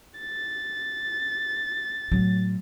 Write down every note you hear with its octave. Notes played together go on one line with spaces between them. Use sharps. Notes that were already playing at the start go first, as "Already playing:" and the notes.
A6
A2 F#3